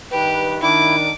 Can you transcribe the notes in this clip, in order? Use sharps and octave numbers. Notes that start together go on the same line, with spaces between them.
G2 D#3 G4 B4
D#3 D4 E4 D6